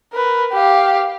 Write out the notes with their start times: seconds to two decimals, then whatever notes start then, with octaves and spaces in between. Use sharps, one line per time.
0.13 A#4 B4
0.52 G4 F5